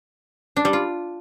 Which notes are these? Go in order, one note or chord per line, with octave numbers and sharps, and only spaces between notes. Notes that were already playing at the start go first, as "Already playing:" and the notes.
D4
G3
F4